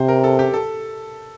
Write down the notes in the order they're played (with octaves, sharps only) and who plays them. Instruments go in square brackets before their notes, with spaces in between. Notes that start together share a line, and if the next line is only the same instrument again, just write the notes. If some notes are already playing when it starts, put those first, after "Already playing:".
Already playing: [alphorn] C3 [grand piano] C5
[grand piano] A#4
A4
G4
A4